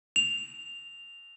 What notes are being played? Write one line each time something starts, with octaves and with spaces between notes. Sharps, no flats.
F7